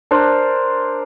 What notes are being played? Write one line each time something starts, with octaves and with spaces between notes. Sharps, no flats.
D4 A#4 C5